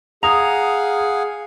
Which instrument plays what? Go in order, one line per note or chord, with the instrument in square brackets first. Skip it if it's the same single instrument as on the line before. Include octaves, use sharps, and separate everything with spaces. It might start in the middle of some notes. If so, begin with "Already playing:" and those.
[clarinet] G#4 [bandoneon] F5 F#5 G#5 [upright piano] A#5 [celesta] D#6 F7